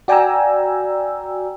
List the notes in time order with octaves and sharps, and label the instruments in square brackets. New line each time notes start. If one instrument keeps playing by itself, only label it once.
[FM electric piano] F#4 D5 G5 G#5 A#5 E6